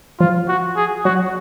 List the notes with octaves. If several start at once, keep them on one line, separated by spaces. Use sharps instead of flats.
F3 F4
F#4
G#4
F#3 F#4